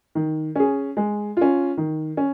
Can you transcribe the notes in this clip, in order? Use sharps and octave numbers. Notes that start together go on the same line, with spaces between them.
D#3
C#4 G#4
G#3
C#4 F4
D#3
C#4